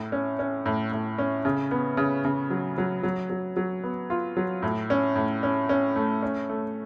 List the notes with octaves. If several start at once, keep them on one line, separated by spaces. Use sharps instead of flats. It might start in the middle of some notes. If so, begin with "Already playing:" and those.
Already playing: A2
C#4
C#4
A2
A2
C#4
C#3
B3
C#3
C#3
F#3
F#3
F#3
F#3
F#3
B3
F4
F#3
A2
C#4
A2
C#4
C#4
A3
C#4
A3